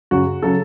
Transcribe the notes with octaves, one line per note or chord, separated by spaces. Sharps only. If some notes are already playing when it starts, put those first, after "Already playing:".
F#2 C#3 F#3 F#4
C#3 F#3 A4